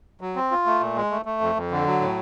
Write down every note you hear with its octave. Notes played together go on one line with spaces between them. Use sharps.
F#3
C4
F4
A3
A#2
G#3
A3
A3
F2
F2
D3
F#3
A2